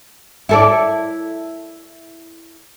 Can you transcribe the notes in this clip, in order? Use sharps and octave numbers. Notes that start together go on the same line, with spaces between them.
E4 A4 D5